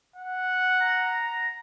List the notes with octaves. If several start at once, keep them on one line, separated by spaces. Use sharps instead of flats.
F#5
A#5